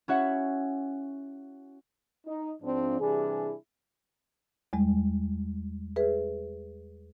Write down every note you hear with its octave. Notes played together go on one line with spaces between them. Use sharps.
C#4 E4 F#4 C#5 E5 F#5
D#4
G#2 F3 C4 D4
C3 E3 G3 D4 E4 G#4
E2 G3 G#3
G#4 B4 E5